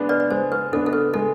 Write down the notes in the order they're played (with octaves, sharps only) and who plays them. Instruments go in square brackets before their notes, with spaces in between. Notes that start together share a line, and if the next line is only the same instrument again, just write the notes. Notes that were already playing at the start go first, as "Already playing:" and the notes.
Already playing: [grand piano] G#3 B3 D4
[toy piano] B4 D5
D5
[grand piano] G#3 [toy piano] C5
[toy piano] B4
[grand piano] B3 D4 [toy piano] A4
[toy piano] A4
B4
[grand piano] G#3 [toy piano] A4